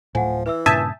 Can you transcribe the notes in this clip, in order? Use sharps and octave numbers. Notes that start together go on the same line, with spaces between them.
D1 A2 F3 F#5 G#5
E3 B4 E5 E6
G2 A#2 C#3 E5 G#5 A5 D#6 G6